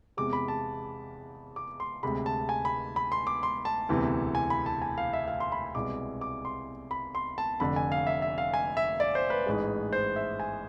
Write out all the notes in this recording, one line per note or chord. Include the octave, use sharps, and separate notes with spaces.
E2 C3 G#3 D6
B5
A5
D6
C6
D2 C3 G#3 B5
A5
G#5
B5
B5
C6
D6
C6
A5
E1 D2 C3 E3
G#5
B5
A5
G#5
F5
E5
F5
C6
B5
C2 B2 G#3 D6
D6
C6
B5
C6
A5
F1 F2 D3 B5
G#5
F5
E5
E5
F5
G#5
E5
D5
C5
B4
A1 G#2 G#3
C5
E5
G#5